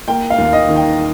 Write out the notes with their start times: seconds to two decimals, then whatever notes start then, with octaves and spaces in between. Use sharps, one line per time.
0.08 A#3 G5
0.30 F5
0.38 D#2
0.53 D#5
0.69 D#3
0.76 G5